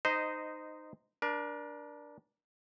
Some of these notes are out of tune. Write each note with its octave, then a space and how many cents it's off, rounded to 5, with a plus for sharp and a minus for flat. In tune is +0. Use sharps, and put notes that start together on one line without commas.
D#4 -15 C5 -20 D#5 +0
D4 +0 A#4 +35